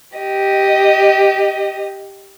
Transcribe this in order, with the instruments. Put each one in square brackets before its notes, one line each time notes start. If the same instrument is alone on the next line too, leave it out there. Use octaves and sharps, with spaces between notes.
[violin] G4 D#5